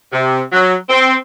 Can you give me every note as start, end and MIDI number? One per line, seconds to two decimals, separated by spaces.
0.13 0.41 48
0.52 0.75 54
0.89 1.15 60